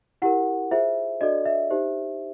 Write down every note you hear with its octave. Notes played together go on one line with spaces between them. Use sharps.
E4 G4 A#4 F#5
F4 G#4 C5 E5
D4 F#4 A4 D5 D#5
E5
D#4 G4 C5